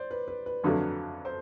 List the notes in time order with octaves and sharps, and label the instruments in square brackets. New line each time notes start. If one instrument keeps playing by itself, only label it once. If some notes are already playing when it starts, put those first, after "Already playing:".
Already playing: [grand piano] C5 D5
B4
B4
B4
[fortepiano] F2 D3 F#3 A3
[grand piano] C5